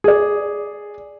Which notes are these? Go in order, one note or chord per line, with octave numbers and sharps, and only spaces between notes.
G#4 D5